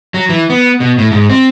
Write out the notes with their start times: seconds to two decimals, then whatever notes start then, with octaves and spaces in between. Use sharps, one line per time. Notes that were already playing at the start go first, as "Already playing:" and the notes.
0.14 F#3
0.29 E3
0.50 B3
0.80 B2
0.98 A2
1.12 G#2
1.30 C4